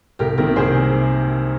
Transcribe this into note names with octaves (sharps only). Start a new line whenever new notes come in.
C2 G4 A#4
C3 D#3 A#3 G4 A#4
C2 G#4 C5